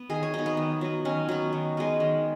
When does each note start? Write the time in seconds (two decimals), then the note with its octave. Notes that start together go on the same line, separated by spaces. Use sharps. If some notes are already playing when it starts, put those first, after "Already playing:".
Already playing: B3
0.09 D#3 G#4
0.23 C#5
0.34 F#3 B3 D#4
0.46 B3
0.57 D#3
0.81 F#3 B3
1.05 D#3 C#4
1.29 F#3 B3
1.53 D#3
1.77 G#3 B3
2.00 D#3